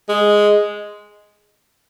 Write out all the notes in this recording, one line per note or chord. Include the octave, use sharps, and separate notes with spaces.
G#3